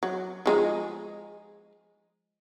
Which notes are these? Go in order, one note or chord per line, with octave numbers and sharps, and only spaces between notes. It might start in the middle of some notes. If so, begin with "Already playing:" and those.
F#3
F3 G#3 D#4